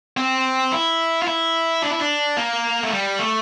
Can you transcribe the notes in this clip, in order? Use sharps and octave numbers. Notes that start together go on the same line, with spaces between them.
C4
E4
F4
E4
D4
E4
D4
A#3
A3
G3
A3